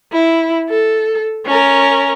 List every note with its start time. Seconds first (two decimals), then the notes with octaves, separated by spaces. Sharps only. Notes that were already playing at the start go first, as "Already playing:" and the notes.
0.12 E4
0.69 A4
1.46 C#4 A#4